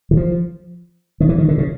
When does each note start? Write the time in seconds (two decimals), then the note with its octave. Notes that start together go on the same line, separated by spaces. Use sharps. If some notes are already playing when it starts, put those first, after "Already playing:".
0.11 E3
0.17 F3
1.20 D#3
1.29 E3
1.38 D#3
1.48 D3
1.58 C#3